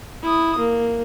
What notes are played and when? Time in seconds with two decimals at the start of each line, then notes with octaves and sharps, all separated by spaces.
0.23 E4 D#6
0.58 A#3